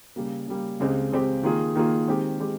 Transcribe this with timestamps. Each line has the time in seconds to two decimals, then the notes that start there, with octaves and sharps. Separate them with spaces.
0.16 C#3 G3 A#3
0.47 C#3 G3 A#3
0.80 C#2 C#3 G#3 C4 G4
1.12 C#2 C#3 G#3 C4 G4
1.43 D#3 A#3 F4 G#4
1.75 D#3 A#3 F4 G#4
2.07 D#3 G#3 C4 G4
2.40 D#3 G#3 C4 G4